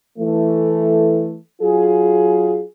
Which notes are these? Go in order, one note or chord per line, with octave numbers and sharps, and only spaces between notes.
E3 A3
F#3 F4 G#4